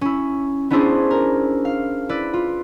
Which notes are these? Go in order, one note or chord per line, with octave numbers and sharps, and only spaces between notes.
C#4 E4
B3 C#4 D4 E4 G#4 C5
A#4
F5
E4 B4 D5
F4